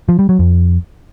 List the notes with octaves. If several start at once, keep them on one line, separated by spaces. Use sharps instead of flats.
F3
G3
F#3
F2